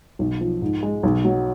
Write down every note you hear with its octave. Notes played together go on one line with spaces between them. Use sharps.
B1
F3
G#2
G#3
B1
F#3